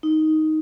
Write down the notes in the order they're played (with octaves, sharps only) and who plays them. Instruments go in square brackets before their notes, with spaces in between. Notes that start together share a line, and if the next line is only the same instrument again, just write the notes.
[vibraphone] D#4